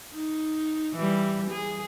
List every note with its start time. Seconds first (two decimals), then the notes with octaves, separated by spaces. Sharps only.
0.12 D#4
0.95 E3 G3
1.52 G#4